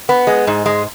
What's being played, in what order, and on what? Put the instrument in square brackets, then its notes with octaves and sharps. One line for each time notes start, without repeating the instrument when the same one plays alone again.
[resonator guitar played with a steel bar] B3
G#3
G#2
G#3